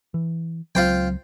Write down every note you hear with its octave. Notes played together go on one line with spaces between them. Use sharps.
E3
C#2 F#3 C4 F4 C5 G5